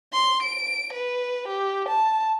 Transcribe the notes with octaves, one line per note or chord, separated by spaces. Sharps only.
C6
D7
B4
G4
A5